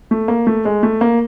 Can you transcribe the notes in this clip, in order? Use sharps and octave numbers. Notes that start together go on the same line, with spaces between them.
A3
A#3
A3
G#3
A3
A#3